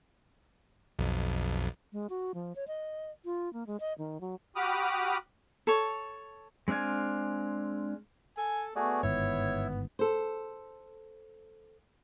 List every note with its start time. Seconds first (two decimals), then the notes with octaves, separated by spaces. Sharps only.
0.99 B1 F2
1.92 G#3
2.10 F#4
2.34 F3
2.56 C#5
2.68 D#5
3.25 F4
3.53 A#3
3.67 G#3
3.80 D#5
3.98 D#3
4.21 F#3
4.56 F#4 G4 B5 D6 D#6 F6
5.67 A4 C#5
6.68 G#3 C4 D4 F5 G#5
8.38 A4 G#5
8.76 A3 B3 F#4 G#4 D5
9.03 G1 G#2 D#3 E4 C#5
9.99 A4 C5